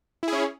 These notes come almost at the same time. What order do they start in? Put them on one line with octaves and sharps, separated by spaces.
E4 G#4 C#4